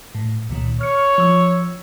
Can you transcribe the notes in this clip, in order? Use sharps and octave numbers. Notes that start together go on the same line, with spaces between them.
A2
C#2 A#2 D#3
C#5 F6 C#7
F3 E6